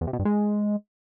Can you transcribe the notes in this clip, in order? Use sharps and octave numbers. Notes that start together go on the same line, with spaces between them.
E2
C3
B2
G2
G#3